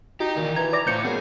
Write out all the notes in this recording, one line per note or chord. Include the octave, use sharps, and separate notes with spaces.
D#4 F#4 G4
A#2 D#3 E3
E3 A#5 G#6
D5 D6 A#6
A2 F3 G6 C#7
F#2 B3 G#4